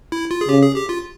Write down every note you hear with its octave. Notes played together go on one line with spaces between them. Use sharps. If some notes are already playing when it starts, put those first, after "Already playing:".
E4
F4
G#4
C#3 G4
G#4
G4
F4